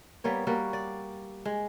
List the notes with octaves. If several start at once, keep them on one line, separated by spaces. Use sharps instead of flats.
G3 A#3 B3 C#5
G3 A#3 F#4
D5
G#3